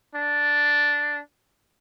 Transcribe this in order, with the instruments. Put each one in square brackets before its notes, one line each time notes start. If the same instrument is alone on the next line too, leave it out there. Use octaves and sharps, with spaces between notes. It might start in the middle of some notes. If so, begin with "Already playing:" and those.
[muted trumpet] D4